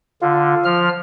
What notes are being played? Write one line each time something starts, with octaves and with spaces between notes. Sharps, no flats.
D3 F4
F3 F6